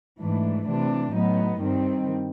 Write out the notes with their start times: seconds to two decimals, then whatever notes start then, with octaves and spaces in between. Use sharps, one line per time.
0.19 G#2 E3 A3 D4
0.67 C3 E3 A3 D4
1.13 A2 F#3 B3 D#4
1.61 G2 D#3 G3 C4